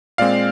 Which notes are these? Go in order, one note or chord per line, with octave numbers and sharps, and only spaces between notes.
A#2 G#3 C4 D5 F5